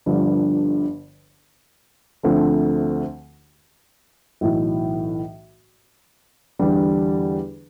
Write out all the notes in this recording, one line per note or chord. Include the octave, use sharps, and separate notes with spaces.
G1 G2 D3 F3
D2 D3 F3 A3 C4
B1 A2 E3
E2 D3 G3 D4